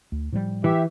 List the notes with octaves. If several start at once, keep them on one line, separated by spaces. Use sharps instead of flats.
D2
A2 F3 G3
E3 G4 E5